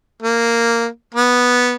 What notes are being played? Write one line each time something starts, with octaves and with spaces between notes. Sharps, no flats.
A#3
B3